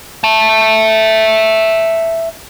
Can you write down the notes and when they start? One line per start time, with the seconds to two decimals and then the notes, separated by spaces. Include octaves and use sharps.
0.24 E5 A5